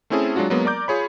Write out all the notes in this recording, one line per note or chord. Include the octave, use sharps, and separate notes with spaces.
A3 C4 C#4 E4 G#4 A4
F#3 G#3 D4 F4 F#4
F#3 G#3 A#3 B3
A#4 D5 A#5 D6 G6
F4 G#4 C#5 B5